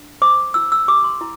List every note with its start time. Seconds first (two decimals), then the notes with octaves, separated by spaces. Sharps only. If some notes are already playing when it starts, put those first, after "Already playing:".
Already playing: D4
0.22 C5 D6
0.54 E4 E6
0.72 E6
0.88 G4 D6
1.04 C6
1.21 E4